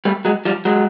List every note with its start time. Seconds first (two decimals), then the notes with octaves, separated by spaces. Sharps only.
0.05 G3 A3
0.25 F#3 G#3
0.45 F3 G3
0.65 F#3 G#3